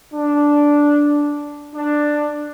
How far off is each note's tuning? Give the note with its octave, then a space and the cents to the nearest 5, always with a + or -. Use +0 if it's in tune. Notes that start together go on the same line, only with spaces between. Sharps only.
D4 -5
D4 +10